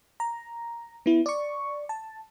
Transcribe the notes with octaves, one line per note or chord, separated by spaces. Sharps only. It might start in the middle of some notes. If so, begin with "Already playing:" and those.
A#5
B3 E4
D5 C#6
A5